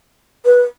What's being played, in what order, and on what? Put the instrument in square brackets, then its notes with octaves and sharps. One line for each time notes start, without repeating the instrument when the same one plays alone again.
[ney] B4